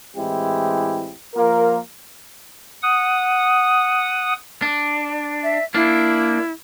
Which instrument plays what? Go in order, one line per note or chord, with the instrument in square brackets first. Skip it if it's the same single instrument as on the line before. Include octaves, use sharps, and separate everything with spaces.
[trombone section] A2 E3 G#3 C4 E4 G4
F3 A#3 F4 A#4
[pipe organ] F#5 D#6
[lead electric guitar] D4
[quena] E5
[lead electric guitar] A#3 D4 [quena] E4